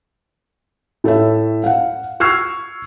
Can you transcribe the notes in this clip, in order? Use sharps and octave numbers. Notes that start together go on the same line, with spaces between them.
A2 A4 C#5 E5
F5 F#5
C#6 E6 F6 G#6 C7